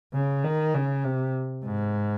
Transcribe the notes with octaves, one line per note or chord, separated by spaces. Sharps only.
C#3
D#3
C#3
C3
G#2